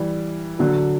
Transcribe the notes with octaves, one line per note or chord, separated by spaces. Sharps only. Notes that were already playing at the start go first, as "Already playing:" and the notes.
Already playing: E3 G3
D3 F#3